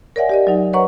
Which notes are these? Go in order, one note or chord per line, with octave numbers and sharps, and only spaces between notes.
A#4 C#5 D5 E5 F#5 G#5
G4 D5 D#5
F#3 D#4
B4 C#5 D#5 F#5 A#5 C#6